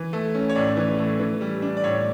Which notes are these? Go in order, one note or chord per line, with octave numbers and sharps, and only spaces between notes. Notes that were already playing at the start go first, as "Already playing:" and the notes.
Already playing: E3
A3
C#4
C#5
A2 D5
E3
A3
E3
G3
D4
D5
A2 C#5